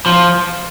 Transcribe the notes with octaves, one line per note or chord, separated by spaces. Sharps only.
F3